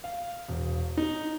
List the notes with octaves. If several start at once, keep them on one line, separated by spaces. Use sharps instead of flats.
F5
E1
D#4